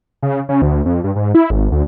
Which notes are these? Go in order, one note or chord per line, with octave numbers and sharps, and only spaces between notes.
C#3
C#3
D2
F2
G2
G#2
E4
G#1
D2